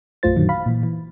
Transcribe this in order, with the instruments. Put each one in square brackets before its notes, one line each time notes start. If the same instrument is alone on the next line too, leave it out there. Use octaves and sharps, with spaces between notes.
[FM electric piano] A#1 F#2 A3 F4 C5 A6
F#2 A#2 D3 D#3 F#3
F5 B5
A#2 E3
E3